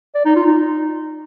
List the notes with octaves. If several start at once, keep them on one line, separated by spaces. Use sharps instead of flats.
D5
D#4
F4
D#4